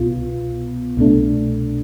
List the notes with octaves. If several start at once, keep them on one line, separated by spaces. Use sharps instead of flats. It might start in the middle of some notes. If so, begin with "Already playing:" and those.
Already playing: C2 B2 B3 F4
C2 B2 A3 D4